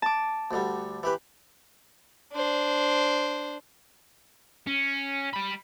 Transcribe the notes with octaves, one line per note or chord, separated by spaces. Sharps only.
A5 D6
D2 D3 G3
E3 G4 B4
D4 C5
C#4
G3 B5